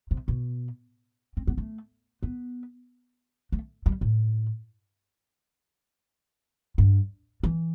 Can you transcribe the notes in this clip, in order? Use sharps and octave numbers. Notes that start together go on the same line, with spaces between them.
C3
B2
C4
B3
A3
B3
A3
G3
A2
G2
E3